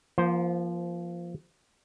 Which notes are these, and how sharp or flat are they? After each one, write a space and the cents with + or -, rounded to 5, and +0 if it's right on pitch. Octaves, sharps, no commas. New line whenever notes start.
F3 -15 A#3 +30 C5 +0